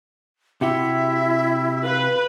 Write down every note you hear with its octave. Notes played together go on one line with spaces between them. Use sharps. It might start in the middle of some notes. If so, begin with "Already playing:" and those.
C3 E4 F#4 G4 E5
B4 F5